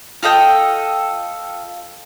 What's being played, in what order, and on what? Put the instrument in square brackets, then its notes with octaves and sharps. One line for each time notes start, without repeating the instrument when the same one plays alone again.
[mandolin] F4 A4 D#5 G5